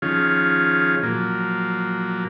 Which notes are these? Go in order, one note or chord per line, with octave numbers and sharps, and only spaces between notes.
D#3 F3 C#4 F4 G#4
A#2 F3 F#3 A#3